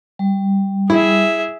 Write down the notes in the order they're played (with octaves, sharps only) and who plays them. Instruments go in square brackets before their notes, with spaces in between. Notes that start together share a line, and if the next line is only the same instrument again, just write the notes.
[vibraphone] G3
[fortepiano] E4 [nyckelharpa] G#4 E5